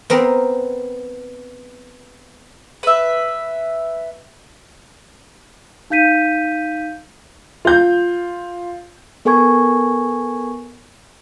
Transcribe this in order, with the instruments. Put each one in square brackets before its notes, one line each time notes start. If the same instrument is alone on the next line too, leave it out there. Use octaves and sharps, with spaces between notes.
[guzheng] B3 C4 A#4
[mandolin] B4 E5
[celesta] D#4 F5 G6 B6 D#7
[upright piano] F4 G6
[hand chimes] B3 A4 A#4 G#5 C#6 G#6